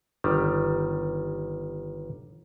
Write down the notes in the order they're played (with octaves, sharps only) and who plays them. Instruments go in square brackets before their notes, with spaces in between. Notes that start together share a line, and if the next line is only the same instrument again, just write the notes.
[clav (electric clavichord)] G1 D#3 G3